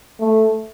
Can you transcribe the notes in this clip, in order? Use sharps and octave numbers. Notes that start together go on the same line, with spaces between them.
A3